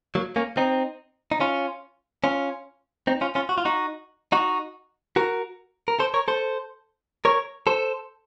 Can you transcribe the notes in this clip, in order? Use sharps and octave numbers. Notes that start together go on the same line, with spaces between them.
F#3 A#3
A#3 C#4
C4 D#4
D#4
C#4 F4
C#4 F4
C4 D#4
C#4 F4
C#4 F4
F#4
F4
D#4 F#4
D#4 F#4
F#4 A#4
A#4
A4 C5
A#4 C#5
A4 C5
A#4 C#5
A4 C5